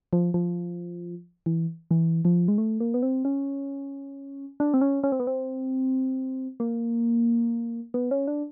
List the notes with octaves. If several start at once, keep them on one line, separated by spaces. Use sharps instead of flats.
F3
F3
E3
E3
F3
G#3
A3
A#3
B3
C4
C#4
D4
C4
C#4
C#4
C4
B3
C4
A#3
B3
C#4
D4